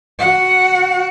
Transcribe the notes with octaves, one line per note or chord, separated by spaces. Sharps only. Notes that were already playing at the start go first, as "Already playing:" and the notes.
F#4 F#5